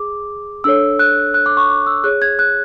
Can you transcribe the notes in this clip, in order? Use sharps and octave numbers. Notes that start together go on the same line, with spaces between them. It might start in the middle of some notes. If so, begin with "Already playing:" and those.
Already playing: G#4 D6
D4 A4 C#5 E6
F#6
F#6
D6
C#6
D6
E6
G#4 C#5 F#6
G#6
F#6